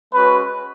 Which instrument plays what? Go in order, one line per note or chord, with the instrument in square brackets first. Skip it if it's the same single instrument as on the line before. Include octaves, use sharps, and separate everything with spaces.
[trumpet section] G#3 C#4 F#4 B4